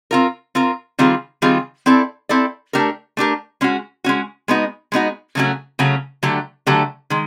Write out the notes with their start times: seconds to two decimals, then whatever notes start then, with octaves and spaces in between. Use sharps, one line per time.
0.11 C4 F4 A#4
0.55 C4 F4 A#4
0.99 D#3 G3 C4 F4 G#4
1.42 D#3 G3 C4 F4 G#4
1.86 C4 E4 A4 D5
2.29 C4 E4 A4 D5
2.73 A3 D4 G4 A#4
3.17 A3 D4 G4 A#4
3.61 G#3 C#4 F#4
4.04 G#3 C#4 F#4
4.48 G#3 B3 D#4 F#4
4.92 G#3 B3 D#4 F#4
5.35 C#3 F#3 A3 C#4 F#4
5.79 C#3 F#3 A3 C#4 F#4
6.23 D3 F#3 A3 D4 G4
6.67 D3 F#3 A3 D4 G4
7.10 D#3 G#3